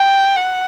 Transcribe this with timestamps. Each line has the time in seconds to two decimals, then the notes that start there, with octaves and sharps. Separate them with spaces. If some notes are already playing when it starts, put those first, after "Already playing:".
Already playing: G5
0.36 F#5